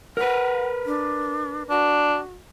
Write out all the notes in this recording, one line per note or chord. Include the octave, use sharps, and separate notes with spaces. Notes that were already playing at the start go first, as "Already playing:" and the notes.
A#4 B4 F#5
D4
D4 F#4